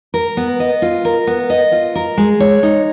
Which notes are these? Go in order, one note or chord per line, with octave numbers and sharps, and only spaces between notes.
A#4
B3
D#5
F4
A#4
B3
D#5
F4
A#4
G#3
C#5
D#4